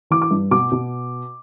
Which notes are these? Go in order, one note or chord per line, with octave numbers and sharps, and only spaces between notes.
E3 D6
D6
G2
B2 D6
B2